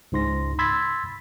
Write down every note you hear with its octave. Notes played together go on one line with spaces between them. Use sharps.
C#2 G#2 C6 A#6
B5 C6 E6 G#6 A6 B6